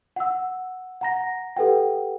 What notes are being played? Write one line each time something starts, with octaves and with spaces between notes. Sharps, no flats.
F#5 E6
F#5 A#5 A#6
G4 A4 B4 F#5 G5